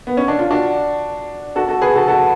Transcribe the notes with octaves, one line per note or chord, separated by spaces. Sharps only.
B3
C#4
D4
F4
D4 F#4
F#4 A4
F#4 A4
G#4 B4
F#4 A4
F#4 A4